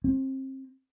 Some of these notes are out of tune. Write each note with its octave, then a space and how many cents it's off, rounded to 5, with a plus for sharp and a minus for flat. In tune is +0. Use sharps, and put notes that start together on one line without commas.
C4 +30